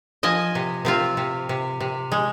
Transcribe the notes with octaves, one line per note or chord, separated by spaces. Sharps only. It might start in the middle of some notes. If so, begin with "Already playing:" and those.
F3 D#5 G#5
C3
C3 C4 F4
C3
C3
C3
G#3